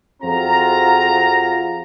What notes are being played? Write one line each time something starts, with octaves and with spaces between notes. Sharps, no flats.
F2 C4 F4 F#4 G#4 A#5